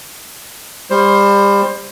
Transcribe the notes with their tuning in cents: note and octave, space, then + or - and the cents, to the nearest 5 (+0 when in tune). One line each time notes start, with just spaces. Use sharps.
G3 +30 C5 +20